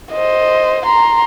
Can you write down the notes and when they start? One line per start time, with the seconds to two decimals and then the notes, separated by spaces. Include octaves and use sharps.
0.12 C5 D#5
0.86 A#5 C6